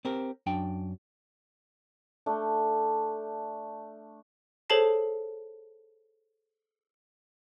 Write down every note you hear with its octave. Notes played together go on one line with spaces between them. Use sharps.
C4 G4 A#4
F#2 D4 G5
A3 D4
G#4 A4 C5 C#5 A5 C7